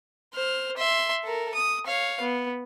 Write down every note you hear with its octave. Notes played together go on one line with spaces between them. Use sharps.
C5 F6
E5 C6
A4 A#4
D#6
C#5 F5
B3